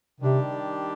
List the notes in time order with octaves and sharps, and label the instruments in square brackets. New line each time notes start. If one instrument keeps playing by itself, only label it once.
[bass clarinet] C3 [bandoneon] D#3 G3 D4 G4